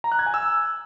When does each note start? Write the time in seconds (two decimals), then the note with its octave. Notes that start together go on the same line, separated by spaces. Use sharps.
0.04 A#5
0.12 F#6
0.19 G#6
0.26 G#5
0.34 E6